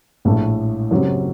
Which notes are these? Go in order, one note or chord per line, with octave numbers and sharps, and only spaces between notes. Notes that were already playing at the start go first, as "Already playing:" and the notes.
A#1 A2 A3
F#1 F#2 F#3 C4 G4